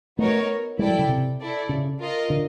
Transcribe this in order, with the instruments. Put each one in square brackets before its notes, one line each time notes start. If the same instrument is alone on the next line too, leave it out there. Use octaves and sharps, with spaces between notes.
[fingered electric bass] A3 [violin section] B3 D#4 F#4 A#4 C#5
[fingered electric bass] G#3 [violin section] E4 A4 D5 G5
[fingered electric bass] F#3
C#3
C3
[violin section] E4 A4 D5
[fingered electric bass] C#3
[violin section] F4 A#4 D#5
[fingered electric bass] D3